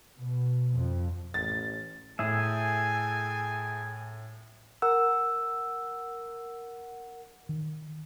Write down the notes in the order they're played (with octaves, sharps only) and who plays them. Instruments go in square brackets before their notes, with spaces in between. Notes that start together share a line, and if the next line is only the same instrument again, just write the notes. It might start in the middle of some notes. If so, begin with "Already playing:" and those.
[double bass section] B2
F2
[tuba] A1 [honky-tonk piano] A6
[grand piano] A2 [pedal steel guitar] G#4 E5 [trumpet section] A4 G5 G#5
[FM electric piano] A#4 F#5 [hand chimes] E6
[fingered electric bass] D#3